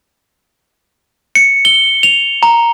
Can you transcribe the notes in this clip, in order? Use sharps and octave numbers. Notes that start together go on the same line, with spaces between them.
C#7
G7
F7
A#5